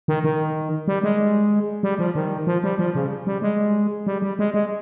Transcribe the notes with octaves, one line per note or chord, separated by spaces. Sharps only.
D#3
D#3
G3
G#3
G3
F3
D#3
F3
G3
F3
C#3
G3
G#3
G3
G3
G#3
G#3